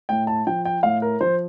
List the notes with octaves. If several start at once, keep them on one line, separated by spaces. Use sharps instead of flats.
A2 G5
A5
F3 G5
G5
A2 F5
A#4
F3 C5